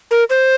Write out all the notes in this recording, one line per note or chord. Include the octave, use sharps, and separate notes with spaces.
A#4
C5